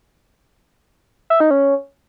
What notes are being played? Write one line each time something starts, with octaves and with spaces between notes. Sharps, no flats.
E5
D#4
C#4